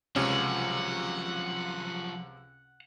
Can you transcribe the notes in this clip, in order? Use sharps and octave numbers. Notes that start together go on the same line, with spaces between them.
C#2 C3 F3 F#3 C#4 F#5